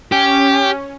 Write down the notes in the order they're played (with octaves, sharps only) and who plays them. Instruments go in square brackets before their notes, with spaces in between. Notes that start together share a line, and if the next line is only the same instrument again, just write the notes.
[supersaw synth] C#4 [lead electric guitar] G4